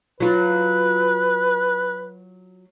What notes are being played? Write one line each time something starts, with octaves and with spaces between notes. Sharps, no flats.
F#3 F4 B4